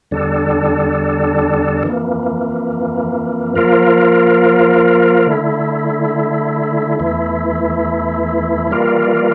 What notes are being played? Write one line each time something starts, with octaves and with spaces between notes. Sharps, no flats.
E2 D3 G3 D4 A4
F2 E3 A#3
F3 A#3 F4 A#4
D3 A3 E4
E2 E3 A3 E4
E3 G3 A#3 F4 A#4